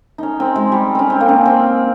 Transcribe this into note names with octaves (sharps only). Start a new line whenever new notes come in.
C#4 D#4
C4
G#3
G3
C4 C#4
C4
A#3
C#4
C4